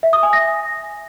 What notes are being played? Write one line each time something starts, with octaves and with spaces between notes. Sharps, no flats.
E5
D#6
G#5
A#6